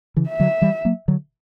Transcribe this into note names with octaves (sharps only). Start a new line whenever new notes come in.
C#3 E3
E5
D3 F#3
E3 G3
F#3 A#3
D3 F#3